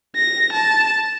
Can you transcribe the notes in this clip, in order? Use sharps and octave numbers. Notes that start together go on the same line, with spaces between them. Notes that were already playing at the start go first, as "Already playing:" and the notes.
A#6
A5